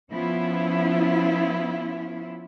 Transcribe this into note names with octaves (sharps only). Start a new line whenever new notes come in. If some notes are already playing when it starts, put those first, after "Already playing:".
F3 B3 C#4 E4 F4